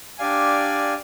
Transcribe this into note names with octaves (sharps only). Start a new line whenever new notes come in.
D4 G4 D5 F5 G#5